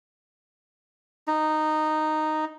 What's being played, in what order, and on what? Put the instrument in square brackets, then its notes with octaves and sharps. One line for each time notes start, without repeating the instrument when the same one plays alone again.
[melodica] D#4